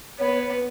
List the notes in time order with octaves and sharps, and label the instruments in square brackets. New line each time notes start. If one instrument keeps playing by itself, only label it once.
[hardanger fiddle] B3 [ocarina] C#5
[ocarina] B4